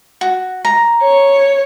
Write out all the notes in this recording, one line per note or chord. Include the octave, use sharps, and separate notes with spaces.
F#4
A#5
C#5